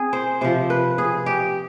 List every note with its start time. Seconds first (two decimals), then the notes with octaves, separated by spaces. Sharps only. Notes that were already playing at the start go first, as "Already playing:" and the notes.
Already playing: C4 G#4
0.13 C5
0.41 C3 F3 C5
0.70 B4
0.98 G#4
1.26 G4